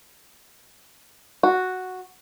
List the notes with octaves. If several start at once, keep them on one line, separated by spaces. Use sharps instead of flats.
F#4